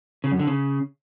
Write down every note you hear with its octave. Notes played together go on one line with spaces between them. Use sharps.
C#3
F#2
D3
C#3